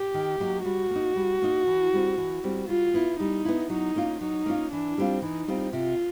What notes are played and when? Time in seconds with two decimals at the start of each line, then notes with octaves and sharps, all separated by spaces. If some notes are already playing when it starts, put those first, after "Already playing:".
Already playing: G4
0.14 D#3
0.40 F#3 A#3 D#4
0.65 G3 F#4
0.90 A#3
0.95 D#4
1.16 G3
1.42 A#3 D#4
1.67 E3
1.93 G3 C4
2.18 E3
2.44 G3 C4
2.68 G3 F4
2.94 B3 E4
3.20 G3 D#4
3.45 B3 E4
3.70 F#3 D#4
3.96 A#3 C#4 F4
4.21 F#3 D#4
4.46 A#3 C#4 F4
4.72 E3 D4
4.98 G3 C4 F4
5.22 E3 D#4
5.48 G3 C4 F4
5.73 C3 F4